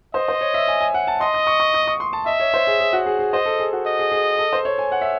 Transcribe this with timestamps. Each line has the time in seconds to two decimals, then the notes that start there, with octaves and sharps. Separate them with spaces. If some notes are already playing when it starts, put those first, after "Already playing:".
0.14 C5 D#5
0.28 C5
0.41 C#5
0.54 E5
0.68 G#5
0.81 G#5
0.94 F#5
1.07 A5
1.20 D#5 C6
1.34 D#6
1.47 C#6
1.60 C#6
1.74 D#6
1.88 C#6
2.00 C6
2.13 A5
2.26 D#5 E5
2.40 C#5
2.54 C5
2.67 G#4
2.80 G#4
2.93 F#4
3.06 G#4
3.19 G#4
3.33 C5 D#5
3.46 A4
3.60 G#4
3.73 F#4
3.86 D#5
3.99 G#4
4.12 G#4
4.39 A4
4.53 C5
4.65 C#5
4.78 G#5
4.92 F#5
5.02 E5